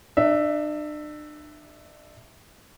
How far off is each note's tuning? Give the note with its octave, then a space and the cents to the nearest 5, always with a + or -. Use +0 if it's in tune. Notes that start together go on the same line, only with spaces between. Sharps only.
D4 +40 E5 +0